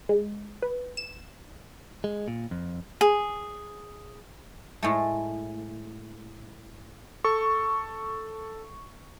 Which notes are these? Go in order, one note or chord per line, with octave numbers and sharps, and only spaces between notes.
G#3
B4
E7
G#3
A#2
F2
G#4
A2 G#3 A3
A4 C#6